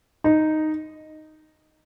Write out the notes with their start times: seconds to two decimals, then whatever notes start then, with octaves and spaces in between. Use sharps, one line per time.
0.24 D#4